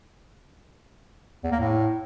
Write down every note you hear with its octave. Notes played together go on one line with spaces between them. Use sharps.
E2
A#3
A2